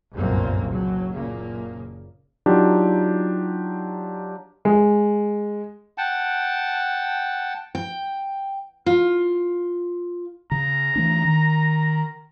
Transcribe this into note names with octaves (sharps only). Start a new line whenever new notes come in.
G1 C2 F#2 A#2 A#3 C4
F#1 F#3
F#1 A#2 C#3 A#3
F#3 D4 D#4 F4 G4
G#3
F#5 G5 A5
G5
F4
C#3 A#5
E3 A3 D4
D#3